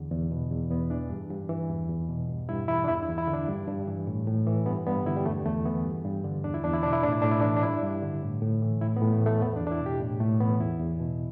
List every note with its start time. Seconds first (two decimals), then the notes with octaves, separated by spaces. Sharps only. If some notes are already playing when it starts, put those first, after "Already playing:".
Already playing: E2 D3
0.11 E2
0.31 B2
0.51 E2
0.70 E2 B3
0.90 E3 D4
1.10 G2
1.30 G2
1.49 E3
1.69 E2
1.89 E2
2.09 B2
2.29 G2
2.49 G2 E4
2.68 E3 E4
2.84 D4
2.88 E2 E4
3.03 E4
3.08 E2
3.18 E4
3.27 D3
3.33 D4
3.48 G2
3.68 G2
3.87 E3
4.07 A2
4.27 A2
4.47 E3
4.66 G2 B3
4.86 G2 B3
5.06 D3 E4
5.17 G3
5.25 E2 A3
5.46 E2 A3
5.65 E3 B3
5.85 G2
6.05 G2
6.24 D3
6.44 E2 D4
6.54 E4
6.64 E2 D4
6.73 E4
6.83 B2 D4
6.93 E4
7.03 A2 D4
7.12 E4
7.22 A2 D4
7.31 E4
7.41 D4
7.43 E3
7.57 D4
7.63 G2 E4
7.83 G2
8.03 D3
8.22 A2
8.42 A2
8.62 E3
8.81 A2 E4
8.97 B3
9.02 A2
9.12 A3
9.21 E3
9.26 A3
9.41 E2 B3
9.56 D4
9.61 E2
9.67 D4
9.71 E4
9.80 B2
9.86 G4
10.01 A2
10.20 A2 A3
10.40 E3 B3
10.60 E2 E4
10.79 E2
11.00 B2